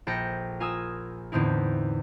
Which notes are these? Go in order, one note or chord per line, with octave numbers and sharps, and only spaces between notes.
A#1 A4 G5 A#6 C#7
F4 A#4 G#5 D#6 E6
E2 A2 D3 C4 D#4 E4